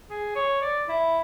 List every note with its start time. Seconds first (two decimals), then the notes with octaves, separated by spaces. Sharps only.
0.09 G#4
0.35 C#5
0.61 D5
0.88 E4